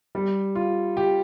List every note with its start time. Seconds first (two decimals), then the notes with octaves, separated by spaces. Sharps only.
0.15 G3
0.55 F4
0.97 G4